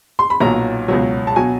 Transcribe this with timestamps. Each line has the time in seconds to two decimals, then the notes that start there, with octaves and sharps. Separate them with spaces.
0.19 C6
0.30 B5
0.40 B1 A#2 F#3 A#5
0.88 C#2 B2 F#3
1.27 A5
1.36 B2 F#3 G#5